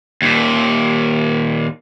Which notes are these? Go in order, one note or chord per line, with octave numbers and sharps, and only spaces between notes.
D#2 A#2